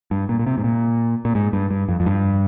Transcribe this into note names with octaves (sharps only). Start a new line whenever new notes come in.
G2
A#2
A#2
C3
G#2
A#2
A#2
G#2
G2
G2
F2
F2
G2